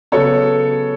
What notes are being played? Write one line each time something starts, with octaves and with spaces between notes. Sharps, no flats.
C#3 F#3 B3 A4 C#5